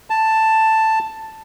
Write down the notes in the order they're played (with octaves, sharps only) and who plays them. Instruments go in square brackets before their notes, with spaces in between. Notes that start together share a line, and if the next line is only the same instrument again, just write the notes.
[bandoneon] A5